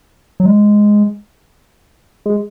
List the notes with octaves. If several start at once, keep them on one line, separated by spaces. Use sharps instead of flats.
F#3
G#3
G#3